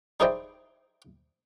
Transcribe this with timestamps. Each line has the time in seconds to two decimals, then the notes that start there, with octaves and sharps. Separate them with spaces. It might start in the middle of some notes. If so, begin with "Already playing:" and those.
0.20 D#4 E4 G#4 C5 D5 G5